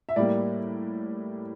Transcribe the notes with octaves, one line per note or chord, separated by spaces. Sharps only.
E5
A2 G3 A#3 D5